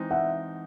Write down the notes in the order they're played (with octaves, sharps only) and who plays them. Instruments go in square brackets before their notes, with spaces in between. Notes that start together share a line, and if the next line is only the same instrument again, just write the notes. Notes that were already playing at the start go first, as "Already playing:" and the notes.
Already playing: [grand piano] E3 G#3 C4 D#4
[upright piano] E5 F#5